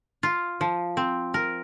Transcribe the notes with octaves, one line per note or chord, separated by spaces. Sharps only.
F4
F3
C4
A#4